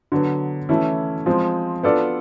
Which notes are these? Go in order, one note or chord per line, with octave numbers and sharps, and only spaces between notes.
D3 F#3 B3
E3 A3 C#4 E4
F3 G#3 C4
B3 D4 F4 A4 D5